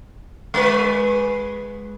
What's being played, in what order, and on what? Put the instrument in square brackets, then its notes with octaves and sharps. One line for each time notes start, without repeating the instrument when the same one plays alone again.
[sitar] G#3 B4